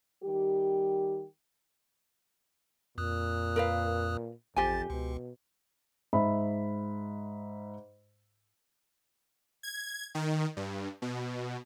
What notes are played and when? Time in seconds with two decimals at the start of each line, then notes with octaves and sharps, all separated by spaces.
0.24 D#3 G3 G4
2.98 F2 A#2 D#6 F#6
3.56 A#4 B4 F5
4.56 A1 F2 G4 C5 G#5 A6
4.90 C#2 B2
6.13 G#2 E5 B5
9.63 G#6
10.15 D#3
10.57 G2
11.02 B2